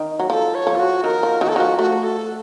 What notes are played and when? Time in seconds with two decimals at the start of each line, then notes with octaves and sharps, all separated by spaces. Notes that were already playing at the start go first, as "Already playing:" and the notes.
Already playing: D#3
0.20 F#3
0.30 F3 A4
0.55 C#5
0.67 F3
0.75 F4
0.79 F#4
1.04 D#3 A#4
1.23 F3
1.41 D#3 F#4
1.48 A4
1.56 D#3 F#4
1.60 F3
1.79 A3 F#4
2.03 A4